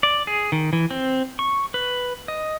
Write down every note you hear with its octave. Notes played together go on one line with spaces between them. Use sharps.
D5
G#4
D#3
E3
C4
C#6
B4
D#5